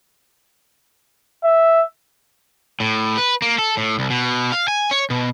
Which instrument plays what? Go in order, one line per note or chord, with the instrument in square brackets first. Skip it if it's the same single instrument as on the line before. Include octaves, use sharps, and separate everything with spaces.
[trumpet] E5
[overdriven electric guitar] A2
B4
A#3
A4
A2
C2
B2
F5
G#5
C#5
B2